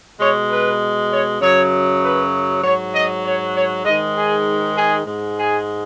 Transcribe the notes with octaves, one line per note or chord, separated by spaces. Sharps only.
B2 G#3 C#5
B4
C#5
F#2 C#3 F#3 C#5
B4
G#2 F#3 C#5
D#5
C#5
C#5
G#2 D#3 G#3 D#5
G#4
G#4
G#2 G#3
G#4